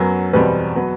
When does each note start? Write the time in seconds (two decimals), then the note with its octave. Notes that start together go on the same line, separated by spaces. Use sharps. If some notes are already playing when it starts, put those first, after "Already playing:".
Already playing: F#2 F#3 B3
0.33 E2 B2 G3 C4 B4
0.76 F#3 B3